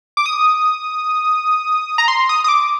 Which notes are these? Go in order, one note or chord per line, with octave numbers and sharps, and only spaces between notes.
D6
D#6
A#5
C6
D#6
D#6
D6